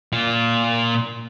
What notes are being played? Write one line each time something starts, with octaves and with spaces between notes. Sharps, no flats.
A#2 F4